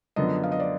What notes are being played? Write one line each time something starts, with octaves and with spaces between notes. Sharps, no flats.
F#2 D3 F3 B3 D#5
F5
D#5
D5